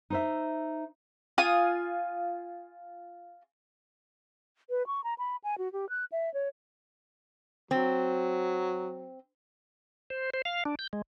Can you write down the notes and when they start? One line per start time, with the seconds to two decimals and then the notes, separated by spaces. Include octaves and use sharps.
0.10 D#4 C5 E5
1.38 F4 G#5 D#6
4.70 B4
4.87 C#6
5.04 A#5
5.18 B5
5.44 G#5
5.58 F#4
5.73 G4
5.89 F#6
6.12 E5
6.34 C#5
7.71 F#3 C4
10.10 C5
10.34 C5
10.45 F5
10.65 D4
10.79 G6
10.93 G#3